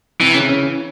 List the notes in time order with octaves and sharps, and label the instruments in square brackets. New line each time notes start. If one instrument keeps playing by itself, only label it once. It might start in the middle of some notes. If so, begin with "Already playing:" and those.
[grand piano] C3 [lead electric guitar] E3
[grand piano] C#3
C#3
E3